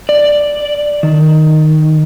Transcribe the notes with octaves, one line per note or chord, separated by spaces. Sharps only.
D5
D#3